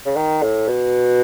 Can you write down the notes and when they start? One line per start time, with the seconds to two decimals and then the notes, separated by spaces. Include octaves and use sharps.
0.06 C#3
0.16 D#3
0.42 A2
0.68 B2